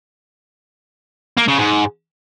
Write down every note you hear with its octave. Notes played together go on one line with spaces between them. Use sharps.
A#3
C#3
G#2